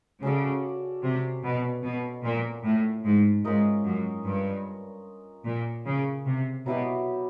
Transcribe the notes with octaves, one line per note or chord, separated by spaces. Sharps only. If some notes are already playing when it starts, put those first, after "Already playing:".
C#3 C#4 F#4 A4 D5
C3
B2
B2
A#2
A2
G#2
G#2 C#4 F4 A#4 D#5
F#2
G2
A#2
C#3
C3
B2 F#3 B3 E4 G4